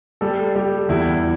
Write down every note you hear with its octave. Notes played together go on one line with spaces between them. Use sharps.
G3 A4
G3 G4
E2 E4